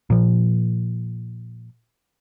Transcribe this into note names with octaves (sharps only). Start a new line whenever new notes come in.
A#2 F3